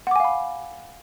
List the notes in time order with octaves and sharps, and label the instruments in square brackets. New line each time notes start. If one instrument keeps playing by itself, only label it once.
[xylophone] F#5
D6
G#5
F5
B5